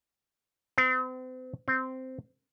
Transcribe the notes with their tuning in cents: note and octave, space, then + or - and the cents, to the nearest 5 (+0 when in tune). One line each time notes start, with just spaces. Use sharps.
C4 -40
C4 -10